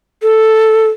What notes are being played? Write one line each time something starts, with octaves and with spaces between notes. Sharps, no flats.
A4